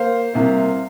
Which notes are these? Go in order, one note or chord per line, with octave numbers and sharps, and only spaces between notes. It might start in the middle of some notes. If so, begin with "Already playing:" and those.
Already playing: A#3 C5 F5
C2 C3 A#3